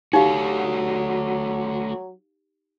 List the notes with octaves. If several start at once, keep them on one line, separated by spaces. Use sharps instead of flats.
F#3 A3 D#4 F#4 G4 F5